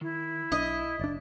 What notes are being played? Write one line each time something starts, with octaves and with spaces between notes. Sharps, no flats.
D#3 E4
B1 D4 D#5 E5
F#1 D4 D5